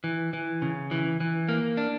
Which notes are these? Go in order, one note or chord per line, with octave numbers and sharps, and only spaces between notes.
E3
E3
C#3
E3
E3
A#3
D4